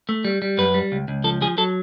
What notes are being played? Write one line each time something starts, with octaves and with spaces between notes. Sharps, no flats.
A3
G3
G3
F#2 B4
G3
C#2
C#2
F3 A4
F3 G#4
F#3 A4